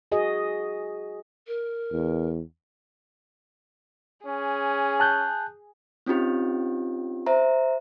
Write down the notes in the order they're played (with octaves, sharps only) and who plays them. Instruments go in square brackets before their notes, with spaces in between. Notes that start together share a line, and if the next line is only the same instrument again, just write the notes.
[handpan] F#4 G#4 D#5
[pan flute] A#4
[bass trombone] E2
[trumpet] C#4 [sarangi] G#4
[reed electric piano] A5 F#6 G6
[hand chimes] C4 C#4 D#4 F4 G4
C5 E5 A#5